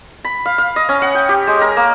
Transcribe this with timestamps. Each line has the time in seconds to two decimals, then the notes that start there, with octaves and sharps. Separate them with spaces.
0.24 B5
0.46 F5
0.58 F5
0.76 D#5
0.89 C#4
1.02 F#5
1.15 G5
1.29 G4
1.47 G#3
1.61 A#4
1.77 A#3